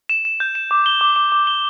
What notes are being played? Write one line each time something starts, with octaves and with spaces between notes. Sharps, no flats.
E7
E7
G6
E7
D6
G7
D6
D6
D6
G7